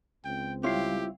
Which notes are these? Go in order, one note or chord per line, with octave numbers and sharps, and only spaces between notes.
C#2 C4 G5
G3 E4 F4 G4 C#5 F5